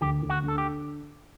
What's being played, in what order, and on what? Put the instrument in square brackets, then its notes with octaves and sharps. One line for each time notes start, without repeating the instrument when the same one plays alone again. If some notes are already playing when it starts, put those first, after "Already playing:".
[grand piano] D2 [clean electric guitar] G4
[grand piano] D2
[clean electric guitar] F#4
[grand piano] D3 [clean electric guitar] A4
[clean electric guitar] G4